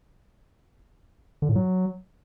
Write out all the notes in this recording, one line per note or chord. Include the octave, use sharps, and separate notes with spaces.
D3
A2
F#3